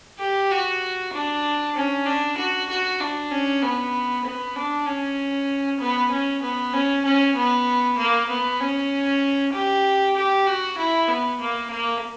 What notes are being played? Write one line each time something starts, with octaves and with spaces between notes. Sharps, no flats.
G4
F#4
D4
C#4
D4
F#4
F#4
D4
C#4
B3
B3
D4
C#4
B3
C#4
B3
C#4
C#4
B3
A#3
B3
C#4
G4
G4
F#4
E4
B3
A#3
A#3